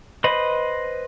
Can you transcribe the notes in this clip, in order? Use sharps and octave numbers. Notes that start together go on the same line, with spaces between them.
B4 C5 D#5 B5